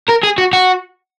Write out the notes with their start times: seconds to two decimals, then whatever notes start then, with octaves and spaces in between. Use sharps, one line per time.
0.08 A#4
0.23 G#4
0.38 F#4
0.53 F#4